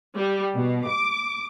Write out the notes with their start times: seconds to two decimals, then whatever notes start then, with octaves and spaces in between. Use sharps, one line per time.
0.16 G3
0.55 B2
0.87 D6